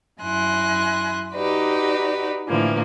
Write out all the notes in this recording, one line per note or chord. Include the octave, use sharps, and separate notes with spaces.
F#2 E4 G#5 C6 F#6 A#6
D#4 F#4 G4 B4 D5
A2 D3 E3 F3 A#3